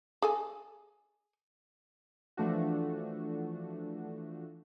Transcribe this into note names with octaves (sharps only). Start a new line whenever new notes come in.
G#4 A4 G#5
E3 F3 A3 D4 F#4